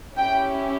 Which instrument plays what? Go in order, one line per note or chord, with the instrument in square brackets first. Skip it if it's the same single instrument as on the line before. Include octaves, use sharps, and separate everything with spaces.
[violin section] C#4 E4 G4 G5